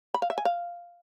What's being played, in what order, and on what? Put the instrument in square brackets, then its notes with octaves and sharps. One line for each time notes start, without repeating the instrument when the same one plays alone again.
[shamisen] B5
F5
E5
G#5
F5